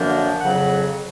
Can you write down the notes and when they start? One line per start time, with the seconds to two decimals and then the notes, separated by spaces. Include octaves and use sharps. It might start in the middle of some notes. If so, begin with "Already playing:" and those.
Already playing: F#2 D3 F3 A#3 D4
0.40 F2 C#3 F#3 F#5